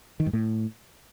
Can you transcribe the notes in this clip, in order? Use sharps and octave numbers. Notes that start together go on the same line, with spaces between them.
D#3
G2
A2